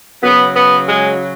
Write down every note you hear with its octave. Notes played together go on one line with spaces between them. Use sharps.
C#3 F#3 B3
B3
G#3